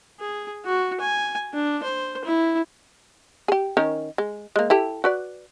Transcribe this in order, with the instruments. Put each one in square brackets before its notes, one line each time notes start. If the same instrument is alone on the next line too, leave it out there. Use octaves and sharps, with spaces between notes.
[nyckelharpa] G#4
F#4
G#5
D4
C5
E4
[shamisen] G4 G#4
D#3 C#4 A#4
G#3
G#3 A#3
E4 G4 A4
F#4 B4 D5